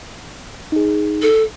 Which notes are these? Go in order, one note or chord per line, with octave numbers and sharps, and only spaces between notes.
D#4 G#4
A4